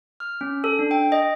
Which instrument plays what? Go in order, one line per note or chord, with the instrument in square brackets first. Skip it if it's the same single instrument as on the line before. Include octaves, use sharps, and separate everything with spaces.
[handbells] F6
C#4
A4
D4
G5
D#5